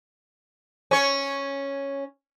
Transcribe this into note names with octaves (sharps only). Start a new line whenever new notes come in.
C#4 C#5